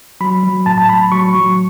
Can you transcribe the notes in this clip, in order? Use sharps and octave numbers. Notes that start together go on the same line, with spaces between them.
F#3 B5
F#3
A2 A5
A5
A2 B5
F#3 C#6
F#3